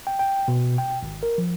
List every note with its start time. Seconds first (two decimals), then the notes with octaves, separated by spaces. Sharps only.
0.07 G5
0.19 G5
0.48 B2
0.78 G5
1.03 G#1
1.23 A#4
1.38 F3